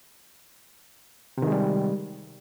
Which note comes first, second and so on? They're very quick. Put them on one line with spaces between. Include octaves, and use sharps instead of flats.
C3 D#3 G#3 G3